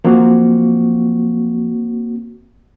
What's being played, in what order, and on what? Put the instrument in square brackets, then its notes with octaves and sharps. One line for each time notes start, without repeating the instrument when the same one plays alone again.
[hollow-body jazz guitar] F3 F#3 F4 [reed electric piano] A#3 C4 F#4